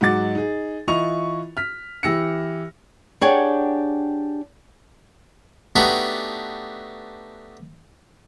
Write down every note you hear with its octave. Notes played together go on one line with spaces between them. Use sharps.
G#2 F#3 D#4 F#5 D6 A6
D#4 G#4
E3 E4 F4 D#5 C#6 F7
F6 B6
E3 G4 E6 A#6 C#7
D4 G4 G#4 C#5 F#5 G5
A3 B3 D4 D#4 F#4 G4